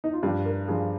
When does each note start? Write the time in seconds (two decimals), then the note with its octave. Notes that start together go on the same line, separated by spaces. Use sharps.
0.04 D#4
0.13 F4
0.23 G2 F3 G4
0.46 A#4
0.68 G2 F3 G#4